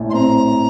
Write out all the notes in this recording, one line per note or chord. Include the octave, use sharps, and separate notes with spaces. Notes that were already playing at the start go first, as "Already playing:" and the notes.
Already playing: A#1 A2
C6
C4 A#5